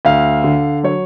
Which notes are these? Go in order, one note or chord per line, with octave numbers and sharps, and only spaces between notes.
D2 F5
D3
F#3 C#5